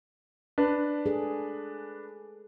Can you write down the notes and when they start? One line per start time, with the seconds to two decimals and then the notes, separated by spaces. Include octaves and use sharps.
0.58 D4 B4
1.06 G#4 A4